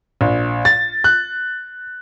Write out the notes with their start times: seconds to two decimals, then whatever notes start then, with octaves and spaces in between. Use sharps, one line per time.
0.21 A#1
0.65 A6
1.04 F#6